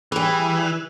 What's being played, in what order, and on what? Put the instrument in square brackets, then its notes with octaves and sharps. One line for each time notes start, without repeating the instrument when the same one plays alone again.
[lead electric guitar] E3 [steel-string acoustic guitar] G3 G#4